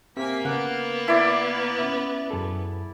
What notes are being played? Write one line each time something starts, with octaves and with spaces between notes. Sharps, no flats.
A#3 C4 G4 E5 G#5 B6
C#3 B3 F#5
E4 D5
C#4 E5
F#2 G#4 A4